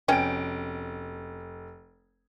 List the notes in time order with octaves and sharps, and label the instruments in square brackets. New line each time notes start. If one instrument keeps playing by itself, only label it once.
[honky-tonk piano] F1 D7 [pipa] B2 C#4 G5